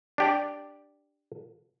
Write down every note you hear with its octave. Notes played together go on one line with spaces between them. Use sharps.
D4 G4 D5